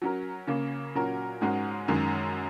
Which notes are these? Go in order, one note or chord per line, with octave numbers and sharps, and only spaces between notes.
F#3 C#4 A#4
C#3 A#3 C#4
A#2 F#3 C#4 F#4 A#4
G#2 G#3 C#4 F#4 A#4
F#2 D#3 G#3 C#4